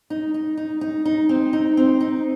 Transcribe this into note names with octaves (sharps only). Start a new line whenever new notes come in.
D#4
D#4
D#4
D#4
D#4
C4
D#4
C4
D#4